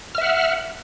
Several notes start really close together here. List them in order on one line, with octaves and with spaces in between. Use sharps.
F6 E5 F#5